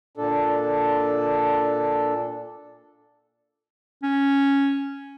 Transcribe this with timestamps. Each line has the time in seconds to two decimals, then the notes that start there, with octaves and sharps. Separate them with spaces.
0.17 A#2 D4 A4
4.03 C#4